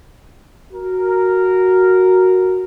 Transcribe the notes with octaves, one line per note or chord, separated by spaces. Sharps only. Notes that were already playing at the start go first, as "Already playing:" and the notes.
F#4 A#4